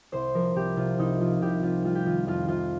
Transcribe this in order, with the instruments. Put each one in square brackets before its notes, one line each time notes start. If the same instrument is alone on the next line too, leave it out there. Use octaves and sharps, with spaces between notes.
[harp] C2 C5
F3 A#4
C2 G4
C3 F4
C2 D#4
F3 F4
C2 G4
C3 F4
G3 F4
G4
D#3 F4
F2 F4
C3 F4